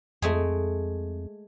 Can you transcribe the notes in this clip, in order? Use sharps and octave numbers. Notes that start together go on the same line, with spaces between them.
F2 G#3 A3 G#4